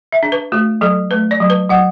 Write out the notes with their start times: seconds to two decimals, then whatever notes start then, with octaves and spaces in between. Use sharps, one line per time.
0.12 E5
0.23 D4
0.32 B4
0.52 A3 F#4
0.81 F#3 A4
1.11 A3 B4
1.31 D5
1.40 F#3
1.50 B4
1.69 F#3 F#5